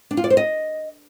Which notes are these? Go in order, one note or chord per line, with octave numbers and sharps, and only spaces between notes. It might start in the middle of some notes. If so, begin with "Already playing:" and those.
D4
F4
D5
C5
D#5